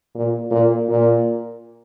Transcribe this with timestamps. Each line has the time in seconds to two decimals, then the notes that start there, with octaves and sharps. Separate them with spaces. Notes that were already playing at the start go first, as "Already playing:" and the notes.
0.15 A#2
0.51 A#2
0.88 A#2